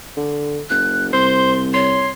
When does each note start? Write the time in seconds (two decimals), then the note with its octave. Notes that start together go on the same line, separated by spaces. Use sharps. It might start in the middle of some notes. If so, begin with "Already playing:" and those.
0.17 D3
0.70 F#1 F#6
1.13 C2 C5 C6
1.74 C#5 C6